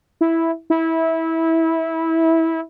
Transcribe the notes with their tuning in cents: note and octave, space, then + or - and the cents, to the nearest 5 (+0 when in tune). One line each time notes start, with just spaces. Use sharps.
E4 -5
E4 -20